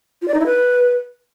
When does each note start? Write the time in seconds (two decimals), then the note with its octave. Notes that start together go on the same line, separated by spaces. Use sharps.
0.22 F4
0.28 D5
0.34 D#4
0.40 E4
0.46 B4